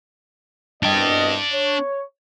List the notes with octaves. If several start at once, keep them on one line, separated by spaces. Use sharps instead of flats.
C2 B2 D4 D#5 G5
C#5